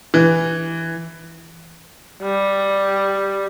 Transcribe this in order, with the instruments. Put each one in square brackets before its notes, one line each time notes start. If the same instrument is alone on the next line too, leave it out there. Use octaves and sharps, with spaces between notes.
[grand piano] E3
[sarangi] G3